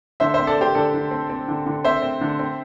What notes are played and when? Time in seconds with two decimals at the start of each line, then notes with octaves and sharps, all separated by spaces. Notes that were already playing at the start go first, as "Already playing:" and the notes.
0.20 D3 C5 E5
0.34 C5 E5
0.39 C4
0.47 A4 D5
0.57 C4 G4 C5
0.75 D3 A4 D5
0.94 D3
1.11 C4
1.29 C4
1.48 D3
1.66 D3
1.85 C4 C5 E5
2.02 C4
2.21 D3
2.39 C4